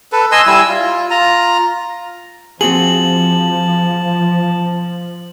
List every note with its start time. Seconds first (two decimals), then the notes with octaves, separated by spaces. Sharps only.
0.12 A4 B4
0.32 D#5 G#5 C6 E6
0.46 G3 E4 G#5 E6
0.68 F4
1.10 F4 A#5
2.61 F3 C4 F#4 G#4 A5 F#7